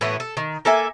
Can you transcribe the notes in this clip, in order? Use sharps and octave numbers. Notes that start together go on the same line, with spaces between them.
A2 E3 B3 F#4
A4
D#3
A#3 A4 E5 G#5